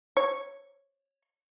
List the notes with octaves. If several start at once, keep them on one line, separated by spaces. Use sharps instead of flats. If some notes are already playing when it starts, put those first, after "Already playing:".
C#5